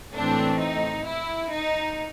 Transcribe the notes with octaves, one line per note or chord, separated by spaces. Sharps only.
A2 E3 A3 C4 D4
D#4
E4
D#4